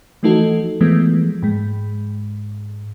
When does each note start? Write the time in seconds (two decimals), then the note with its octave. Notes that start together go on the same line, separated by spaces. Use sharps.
0.23 E3 F3 A3 D#4 F#4 A4
0.81 E3 F3 G#3 A3 B3
1.42 G#2 G#3